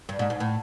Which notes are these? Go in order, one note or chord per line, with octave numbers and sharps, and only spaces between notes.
G2
G#2
G#2
A2